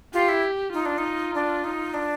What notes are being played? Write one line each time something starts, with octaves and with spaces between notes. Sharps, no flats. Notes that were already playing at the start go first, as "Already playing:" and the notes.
F4 G4
E4
D#4 F4
D4
D#4
D4
D#4
D4